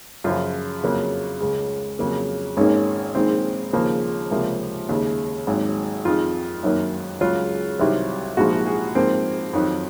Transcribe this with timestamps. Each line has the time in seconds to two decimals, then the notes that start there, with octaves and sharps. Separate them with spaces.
0.24 F#2 C#3 F3 F4
0.83 F2 C#3 F#3 A#3
1.40 C#2 C#3 G#3
1.99 F2 C#3 F#3 A#3
2.57 G#1 G#2 D#3 A#3 C#4
3.15 A#1 G#2 D#3 G#3 C4
3.73 D#2 C#3 F3 A#3
4.31 C#2 C3 F3 A#3
4.89 D#2 C#3 G#3
5.47 G#1 G#2 F#3
6.05 F2 D#3 G#3 F4
6.63 F#2 D#3 F#3 A#3
7.21 C#2 C#3 F#3 F4
7.79 C2 C3 D#3 F#3
8.37 A#1 G#2 F3 F#4
8.66 G#4
8.95 G#2 F3 A#3 C4
9.53 F2 D#3 F#3